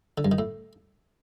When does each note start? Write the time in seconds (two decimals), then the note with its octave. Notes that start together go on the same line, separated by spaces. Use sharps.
0.18 D3
0.25 G2
0.32 D#3
0.39 A2